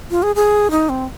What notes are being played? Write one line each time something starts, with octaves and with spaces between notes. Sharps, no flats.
F4
G#4
G#4
D#4
C4